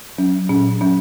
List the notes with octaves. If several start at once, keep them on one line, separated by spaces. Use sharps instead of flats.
F#3 C#4
A#2 C#4
F#3 C#4